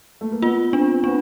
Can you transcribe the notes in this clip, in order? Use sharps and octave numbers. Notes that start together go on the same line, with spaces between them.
A3
A#3
B3 F4
C4 D4
B3 D4